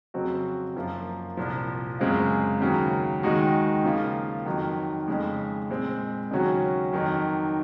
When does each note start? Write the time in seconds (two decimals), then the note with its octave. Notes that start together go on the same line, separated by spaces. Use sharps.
0.14 F2 C#3 F#3 C4 F#4
0.76 F#2 F3 A#3 F4
1.37 C2 A#2 F3
1.99 F#2 C#3 G#3 C4 F4
2.61 D#2 C#3 F#3 A#3
3.23 D#2 D#3 G#3 D#4 F#4
3.84 C#3 F3 A#3 F4
4.46 F2 D#3 F#3
5.08 F2 C#3 G#3
5.70 A#2 G#3 C4
6.31 D#2 C#3 F#3 C#4 F#4
6.93 F2 D#3 F#3